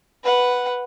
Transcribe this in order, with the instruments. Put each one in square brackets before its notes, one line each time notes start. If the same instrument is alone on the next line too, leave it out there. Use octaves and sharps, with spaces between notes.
[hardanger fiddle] B4 F#5